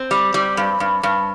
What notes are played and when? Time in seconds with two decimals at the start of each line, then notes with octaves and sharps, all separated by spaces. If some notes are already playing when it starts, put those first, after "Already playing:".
Already playing: C4
0.11 G3
0.34 G3
0.57 G2
0.80 G2
1.03 G2